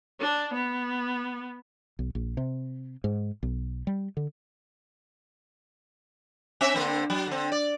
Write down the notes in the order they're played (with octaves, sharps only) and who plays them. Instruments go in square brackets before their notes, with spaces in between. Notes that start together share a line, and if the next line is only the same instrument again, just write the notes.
[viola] D4
B3
[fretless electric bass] B1
A#1
C3
G#2
B1
G3
D3
[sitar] C4 E5
D3 A#3 C4
F#3
D3 C4
D5